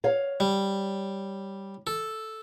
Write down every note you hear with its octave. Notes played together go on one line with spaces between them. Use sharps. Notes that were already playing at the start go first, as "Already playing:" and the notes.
C#5 F5
G3
A4